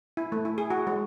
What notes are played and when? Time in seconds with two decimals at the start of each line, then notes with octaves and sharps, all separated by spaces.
0.17 E4
0.32 A3
0.45 E4
0.58 G#4
0.70 F#4
0.87 G#3